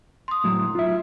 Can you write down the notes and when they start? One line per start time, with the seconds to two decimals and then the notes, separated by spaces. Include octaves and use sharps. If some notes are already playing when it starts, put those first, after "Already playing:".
0.28 C6 D#6
0.44 A2 F#3
0.75 F4 E5